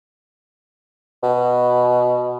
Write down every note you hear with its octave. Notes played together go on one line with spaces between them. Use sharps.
B2